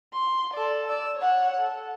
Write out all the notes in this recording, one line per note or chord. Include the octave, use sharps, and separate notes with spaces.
C6
A4 D5
D5 E6
C#5 F#5
A4